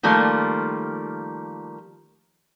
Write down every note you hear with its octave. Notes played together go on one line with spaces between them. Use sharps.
D#3 F3 G3 A3 A#3